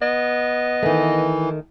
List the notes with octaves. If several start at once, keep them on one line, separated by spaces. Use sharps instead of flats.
B3 D#5
D#3 E3 A3